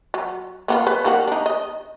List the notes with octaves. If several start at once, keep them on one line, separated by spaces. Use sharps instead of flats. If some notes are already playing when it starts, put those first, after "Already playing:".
F#3
A#3 B3 F4
B4
D#3 A#3 F#4
D4 D#4
D#5